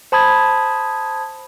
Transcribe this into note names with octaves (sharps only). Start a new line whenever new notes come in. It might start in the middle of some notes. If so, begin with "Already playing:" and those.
C5 A5 B5 D#6 G#6